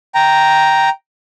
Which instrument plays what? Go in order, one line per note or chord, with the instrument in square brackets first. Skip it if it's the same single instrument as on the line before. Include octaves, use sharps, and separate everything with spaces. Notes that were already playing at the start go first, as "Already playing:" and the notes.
[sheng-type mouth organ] G5 A#5